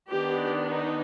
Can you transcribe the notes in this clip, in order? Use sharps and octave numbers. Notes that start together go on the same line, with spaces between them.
D#3 B3 D4 G4
D#4